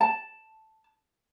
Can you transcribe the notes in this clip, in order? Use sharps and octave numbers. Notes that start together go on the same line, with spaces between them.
A5